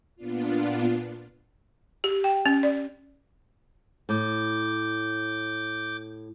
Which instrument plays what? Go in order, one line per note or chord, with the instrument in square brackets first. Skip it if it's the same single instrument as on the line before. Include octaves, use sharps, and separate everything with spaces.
[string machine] A#2 B3 D4 F4
[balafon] G4
G5
C#4
D5
[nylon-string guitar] A2 [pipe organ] D6 G6